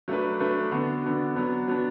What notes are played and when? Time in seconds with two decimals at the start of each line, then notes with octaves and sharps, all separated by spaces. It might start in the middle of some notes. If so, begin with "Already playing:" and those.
0.08 F#3 A3 D4 B4
0.39 F#3 A3 D4 B4
0.71 D3 B3 D4 F#4
1.04 D3 B3 D4 F#4
1.36 F#3 B3 D4
1.68 F#3 B3 D4